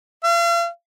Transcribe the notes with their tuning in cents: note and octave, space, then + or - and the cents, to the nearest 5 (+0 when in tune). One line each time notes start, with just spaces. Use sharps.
F5 -40